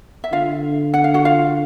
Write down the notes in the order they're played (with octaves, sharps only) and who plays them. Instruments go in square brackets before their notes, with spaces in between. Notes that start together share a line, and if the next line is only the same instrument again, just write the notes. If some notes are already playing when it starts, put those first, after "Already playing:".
[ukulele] E5
[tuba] D3 [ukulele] F4 F5
[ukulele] F#5
F5
F#4 F#5
F4 F5